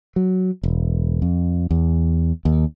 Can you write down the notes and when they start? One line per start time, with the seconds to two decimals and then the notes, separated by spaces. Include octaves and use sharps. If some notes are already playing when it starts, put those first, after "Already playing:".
0.16 F#3
0.63 E1
1.22 F2
1.71 E2
2.45 D#2